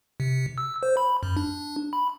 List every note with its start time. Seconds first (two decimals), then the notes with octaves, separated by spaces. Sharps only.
0.20 C3
0.58 E6
0.83 C5
0.97 B5
1.23 F#2
1.37 D4
1.93 B5